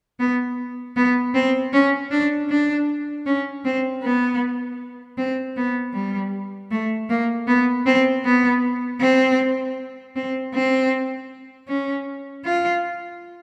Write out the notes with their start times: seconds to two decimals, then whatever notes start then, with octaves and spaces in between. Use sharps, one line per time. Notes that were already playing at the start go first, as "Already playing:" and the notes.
0.20 B3
0.96 B3
1.35 C4
1.73 C#4
2.11 D4
2.49 D4
3.26 C#4
3.65 C4
4.03 B3
5.18 C4
5.56 B3
5.94 G3
6.71 A3
7.10 A#3
7.48 B3
7.86 C4
8.24 B3
9.00 C4
10.16 C4
10.54 C4
11.68 C#4
12.45 F4